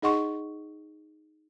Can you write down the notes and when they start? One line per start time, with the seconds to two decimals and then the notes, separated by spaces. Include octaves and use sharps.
0.02 D#4 G#4 D#5 F#5 C6 C#6